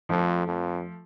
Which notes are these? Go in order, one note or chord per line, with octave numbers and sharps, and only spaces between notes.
F2 F3 A3
F2